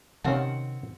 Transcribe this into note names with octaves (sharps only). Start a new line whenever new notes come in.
C3 D#3 C4 C#4 F5 F#5 A5